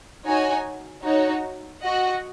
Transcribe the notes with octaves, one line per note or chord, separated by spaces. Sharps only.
D#4 F#4 C#5 G#5
D#4 F#4 C#5
F#4 D#5 F#5